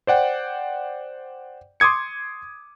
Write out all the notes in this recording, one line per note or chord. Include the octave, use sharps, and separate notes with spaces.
C5 D5 F#5 G5
C6 D6 D#6 G#6 C#7